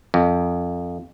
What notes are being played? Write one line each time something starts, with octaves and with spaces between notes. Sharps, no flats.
F2